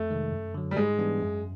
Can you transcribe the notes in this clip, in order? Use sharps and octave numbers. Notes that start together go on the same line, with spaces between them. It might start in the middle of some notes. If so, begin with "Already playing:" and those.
Already playing: F2 A3
C3 D#3 G#3
F#2
D3 F#3
G3
G#2 G#3
E3 G3 B3 D4
F#2